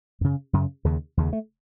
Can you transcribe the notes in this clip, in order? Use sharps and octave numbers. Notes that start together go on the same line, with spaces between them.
F#2 C#3
F#2 C#3
D#2 C#3
D#2 C#3
A3